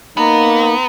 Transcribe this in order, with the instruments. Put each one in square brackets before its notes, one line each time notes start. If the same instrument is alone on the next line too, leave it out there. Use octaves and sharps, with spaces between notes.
[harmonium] A#3 D#4 [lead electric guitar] B3 [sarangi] A#5